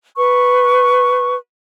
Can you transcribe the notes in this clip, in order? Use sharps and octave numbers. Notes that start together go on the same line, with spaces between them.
B4 C#6